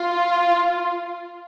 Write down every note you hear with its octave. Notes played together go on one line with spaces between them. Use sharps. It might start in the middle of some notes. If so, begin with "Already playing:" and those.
Already playing: F4